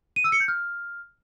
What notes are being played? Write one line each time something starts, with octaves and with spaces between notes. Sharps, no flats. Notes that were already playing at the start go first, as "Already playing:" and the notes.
D#7
E6
C#7
G6
F6